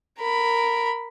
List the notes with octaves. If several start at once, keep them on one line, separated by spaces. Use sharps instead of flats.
A#4 B5